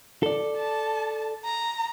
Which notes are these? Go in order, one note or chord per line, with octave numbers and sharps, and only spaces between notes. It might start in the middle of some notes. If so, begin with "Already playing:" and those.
A4 D5
A5
A#5